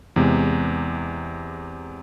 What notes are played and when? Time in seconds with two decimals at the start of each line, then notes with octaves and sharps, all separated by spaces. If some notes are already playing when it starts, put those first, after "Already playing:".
0.16 E2 C3 G#3